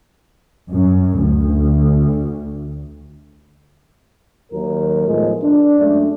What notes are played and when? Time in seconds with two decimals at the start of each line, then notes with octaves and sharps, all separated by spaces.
0.70 F#2
1.21 D2
4.51 D#2 F#3 A#4
5.06 A2 F3 G#3 A3 B3
5.41 D4
5.78 F#2 G#3 A3 D4